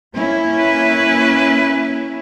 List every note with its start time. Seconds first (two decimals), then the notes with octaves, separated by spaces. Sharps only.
0.14 A#3 C#4 E4
0.58 B4